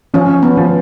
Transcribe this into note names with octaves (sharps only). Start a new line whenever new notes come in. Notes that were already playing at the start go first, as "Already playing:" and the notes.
F3 C#4
B3
F3